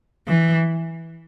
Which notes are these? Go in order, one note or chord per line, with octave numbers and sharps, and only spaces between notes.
E3